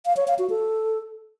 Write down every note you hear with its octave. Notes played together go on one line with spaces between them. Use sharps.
F5
C#5
F5
F#4
A4